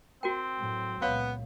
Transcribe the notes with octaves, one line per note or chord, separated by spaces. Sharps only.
C4 F#4 A#4 G5
A2 F#3
C#2 A#2 B3 C#5 F5 C#6